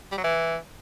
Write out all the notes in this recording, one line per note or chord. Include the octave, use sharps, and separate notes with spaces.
G3
F#3
E3